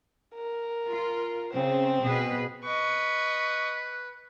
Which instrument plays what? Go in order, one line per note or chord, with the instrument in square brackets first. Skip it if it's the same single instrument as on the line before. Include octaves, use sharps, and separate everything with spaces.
[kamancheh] A#4
[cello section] F4
[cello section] C#3 [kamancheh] C4 C5
[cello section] B2 G#4 B4
[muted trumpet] B4 [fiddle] D#5 C#6